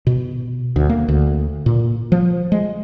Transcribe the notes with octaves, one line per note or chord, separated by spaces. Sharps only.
B2
D2
A#3
D2
A#2
F3
G#3